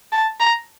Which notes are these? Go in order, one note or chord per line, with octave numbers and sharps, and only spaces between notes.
A5
A#5